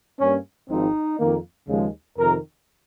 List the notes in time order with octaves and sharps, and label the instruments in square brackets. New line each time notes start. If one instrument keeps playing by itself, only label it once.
[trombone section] G2 G3 A#3 C#4
G#1 G#2 F3 C4 D#4
F2 D#3 A#3
D#2 C#3 F3 G#3
F2 C3 D#3 A#4